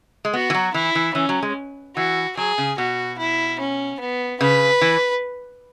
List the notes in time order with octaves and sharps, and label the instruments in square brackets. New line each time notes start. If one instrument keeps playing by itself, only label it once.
[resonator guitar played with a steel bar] G#3
[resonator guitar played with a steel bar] B3 [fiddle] F#4
[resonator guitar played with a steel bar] E3
F#3
[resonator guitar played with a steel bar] E3 [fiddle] E4
[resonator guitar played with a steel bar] E3
[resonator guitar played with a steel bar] E3 [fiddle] C#4
[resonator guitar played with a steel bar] F#3
G#3
[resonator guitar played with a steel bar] E3 [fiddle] F#4
[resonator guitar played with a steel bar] F#3 [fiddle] G#4
[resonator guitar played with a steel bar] C#3
[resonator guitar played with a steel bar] B2 [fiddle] F#4
[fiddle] E4
C#4
B3
[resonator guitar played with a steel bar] C#3 [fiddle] B4
[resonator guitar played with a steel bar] E3